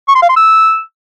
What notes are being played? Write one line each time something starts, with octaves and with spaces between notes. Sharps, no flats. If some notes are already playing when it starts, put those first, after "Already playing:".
C#6
C6
F5
C6
E6